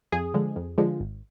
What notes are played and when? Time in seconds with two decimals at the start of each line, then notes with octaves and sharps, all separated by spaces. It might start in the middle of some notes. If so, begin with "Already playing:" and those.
0.12 F2 G#4
0.34 D3 F3 G#3
0.56 F2
0.78 D3 F3 G#3
1.00 G#1